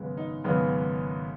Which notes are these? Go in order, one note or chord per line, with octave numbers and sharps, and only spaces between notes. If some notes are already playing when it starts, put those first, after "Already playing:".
Already playing: G#1 F#2 C#3 G#3 B3
D#4
G#1 F#2 C#3 G#3 B3